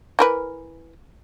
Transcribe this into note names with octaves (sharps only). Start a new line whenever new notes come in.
E3 A#4 B4